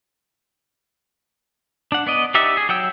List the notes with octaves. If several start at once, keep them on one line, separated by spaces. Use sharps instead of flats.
D4 F#5
B3 D5 D#5
D#4 G4 D5 E5 F#5
G#4
F#3 F#5 G5 E6